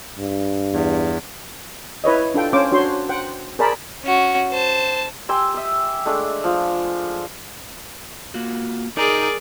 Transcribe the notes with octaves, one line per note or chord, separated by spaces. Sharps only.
G2
E2
E4 B4 C#5 D#5
D4 F4 A4 G5
C#4 C5 C#5 F5 D6
D4 F#4 C5 C#5 C6
C5 F#5 G5
G#4 A#4 C5 D5 A5 B5
C#4 F#4
C5 A5
G4 G#5 C6 E6
E5 D#6
G#3 A3 D4 G#4
F3
A#3 F4 F#4
D#4 G#4 A#4 D5 A#5